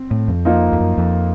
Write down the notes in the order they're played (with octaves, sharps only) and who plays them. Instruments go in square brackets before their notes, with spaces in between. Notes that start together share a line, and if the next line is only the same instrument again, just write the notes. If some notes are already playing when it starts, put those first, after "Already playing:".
Already playing: [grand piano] C4
[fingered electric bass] A2
F2
[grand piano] F3 A#3 D#4
[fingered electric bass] F2
F#2
F2